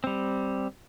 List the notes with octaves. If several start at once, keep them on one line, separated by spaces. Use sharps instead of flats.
G3 C4